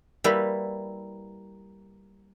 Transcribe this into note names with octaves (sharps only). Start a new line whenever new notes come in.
G3 A#3 E4 F#4 B4 E5